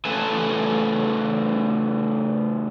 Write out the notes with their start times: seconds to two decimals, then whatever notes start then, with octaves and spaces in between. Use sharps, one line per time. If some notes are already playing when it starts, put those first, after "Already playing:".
0.05 C#3 A3 A4 B4 G#5 A5